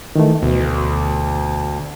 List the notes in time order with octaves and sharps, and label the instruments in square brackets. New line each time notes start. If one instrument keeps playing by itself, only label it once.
[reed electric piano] D#3 E3 A3
[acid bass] D2 [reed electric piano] B2